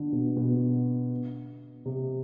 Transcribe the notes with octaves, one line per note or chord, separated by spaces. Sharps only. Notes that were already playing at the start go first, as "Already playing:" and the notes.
Already playing: D3
B2
B2
C3